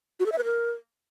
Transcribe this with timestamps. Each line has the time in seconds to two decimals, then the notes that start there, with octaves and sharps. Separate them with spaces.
0.20 F#4
0.26 A4
0.32 E5
0.38 B4
0.44 A#4